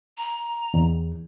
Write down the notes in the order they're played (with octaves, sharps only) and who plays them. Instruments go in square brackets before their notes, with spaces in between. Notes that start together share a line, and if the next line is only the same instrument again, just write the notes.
[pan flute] A#5
[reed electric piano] E2